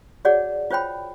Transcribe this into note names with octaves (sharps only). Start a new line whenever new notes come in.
F#4 G#4 C#5 D5 F#5
F4 C5 C#5 G5 B5